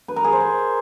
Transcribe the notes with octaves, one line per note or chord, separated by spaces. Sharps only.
B4
A#4
G#4
C5
A#4